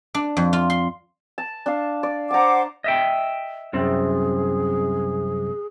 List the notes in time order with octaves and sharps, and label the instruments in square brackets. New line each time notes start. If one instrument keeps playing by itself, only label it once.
[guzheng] D4
F2
F4
C6
[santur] A5
D4 F5
D5
[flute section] C5 F#5 D6 [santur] A5 A#5
[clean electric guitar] D#5 E5 G5
[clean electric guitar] C2 F#2 C4 [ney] G#4